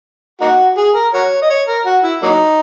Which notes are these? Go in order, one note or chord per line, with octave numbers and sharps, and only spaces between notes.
A#3 D#4 F#4
G#4
A#4
F#4 A#4 C#5
D#5
C#5
A#4
F#4
E4
F#3 A#3 D#4